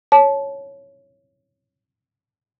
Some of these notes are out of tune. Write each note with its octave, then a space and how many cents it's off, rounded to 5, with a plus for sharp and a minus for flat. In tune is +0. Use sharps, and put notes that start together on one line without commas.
C#5 +0 A5 -25